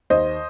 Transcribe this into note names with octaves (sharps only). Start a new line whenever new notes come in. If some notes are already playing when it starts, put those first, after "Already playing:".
D#2 C5 D#5